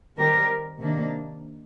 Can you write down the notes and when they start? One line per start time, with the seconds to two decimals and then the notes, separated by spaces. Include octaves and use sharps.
0.16 D#3 G3 C4 G4 A#4
0.79 C3 D#3 A#3 D4